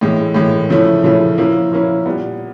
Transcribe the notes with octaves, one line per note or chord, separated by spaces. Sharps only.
A2 E3 G#3
A2 E3 G#3
C#3 F3 A3 C#4 E4
C#3 F3 A3 C#4 E4
F3 A#3 C#4 E4
F3 A#3 C#4 E4
A#2 G3 B3